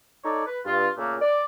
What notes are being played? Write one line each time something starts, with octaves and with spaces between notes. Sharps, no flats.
D#4 A4 C#5 D5
B4
G2 F4
A#2 C#3 A3 A#3
D5